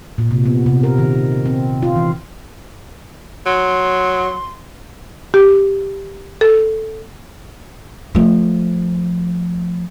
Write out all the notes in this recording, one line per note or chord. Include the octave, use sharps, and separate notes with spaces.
A#2
C3
B3
C3
A#4
D#3
C4
F4
E3
F#3 C6
G4
A4
F3 A3